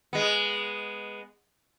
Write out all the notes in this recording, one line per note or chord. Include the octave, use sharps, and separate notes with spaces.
G#3 B3